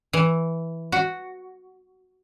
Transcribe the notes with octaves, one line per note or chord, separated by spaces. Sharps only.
E3
F#4